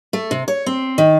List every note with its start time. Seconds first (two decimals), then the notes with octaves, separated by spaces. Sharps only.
0.13 A3
0.31 C3
0.48 C#5
0.66 C4
0.98 D#3